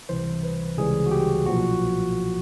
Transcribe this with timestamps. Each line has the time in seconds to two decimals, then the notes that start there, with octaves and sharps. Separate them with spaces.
0.09 C#2 C3 E3 G3 C5
0.43 B4
0.77 C#2 C3 E3 G3 G#4
1.06 F#4
1.11 G4
1.46 B1 A#2 F3 F#4